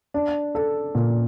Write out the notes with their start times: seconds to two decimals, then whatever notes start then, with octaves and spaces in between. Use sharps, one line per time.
0.14 D4
0.55 A4
0.95 A#2